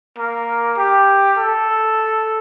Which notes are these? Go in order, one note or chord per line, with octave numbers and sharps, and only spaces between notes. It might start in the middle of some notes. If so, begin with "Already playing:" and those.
A#3
G4
A4